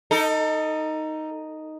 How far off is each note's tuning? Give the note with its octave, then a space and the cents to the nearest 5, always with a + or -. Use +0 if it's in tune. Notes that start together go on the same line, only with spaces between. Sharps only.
D#4 +0 A4 +30